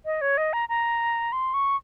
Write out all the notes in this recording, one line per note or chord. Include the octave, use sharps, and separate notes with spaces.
D#5
C#5
D#5
A#5
A#5
C6
C#6